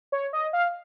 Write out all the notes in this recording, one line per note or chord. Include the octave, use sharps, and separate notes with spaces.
C#5
D#5
F5